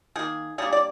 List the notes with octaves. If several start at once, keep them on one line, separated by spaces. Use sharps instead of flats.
D#3 A#3 G#4
D3 G3 A#3 G#4
D5